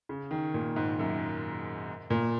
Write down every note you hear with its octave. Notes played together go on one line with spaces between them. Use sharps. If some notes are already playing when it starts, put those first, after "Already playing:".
C#3
D#3
A#2
G#2
F#2
A#2